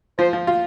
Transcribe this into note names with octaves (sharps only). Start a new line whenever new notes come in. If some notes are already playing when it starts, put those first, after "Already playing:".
F3 C5
F3
F4